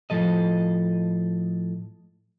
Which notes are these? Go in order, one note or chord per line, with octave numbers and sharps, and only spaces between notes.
A2 F3 A4 D#5